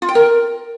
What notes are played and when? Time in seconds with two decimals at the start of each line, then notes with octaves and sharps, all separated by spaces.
0.02 F4
0.09 G5
0.15 A#4